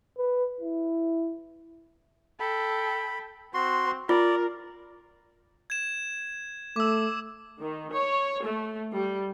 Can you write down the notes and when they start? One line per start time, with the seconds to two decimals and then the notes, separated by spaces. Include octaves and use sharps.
0.18 B4
0.61 E4
2.40 A4 G5 B5
3.54 C4 F#4 C6
4.09 F4 A#4 D5
5.70 G#6 E7
6.76 A3 D6 E6
7.60 D#3
7.91 C#5
8.44 A3
8.93 G3